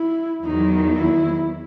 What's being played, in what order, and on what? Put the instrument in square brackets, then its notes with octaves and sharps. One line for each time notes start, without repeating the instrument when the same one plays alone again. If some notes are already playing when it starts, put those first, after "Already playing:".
Already playing: [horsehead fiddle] E4
[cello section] E2 D#3 F#3 [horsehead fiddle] D#4
[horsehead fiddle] E4